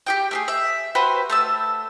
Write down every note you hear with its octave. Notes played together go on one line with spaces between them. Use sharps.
G4 G#4 G5
A3 D4 G#4
E5
F#4 G4 B4 C5
A3 A5 E6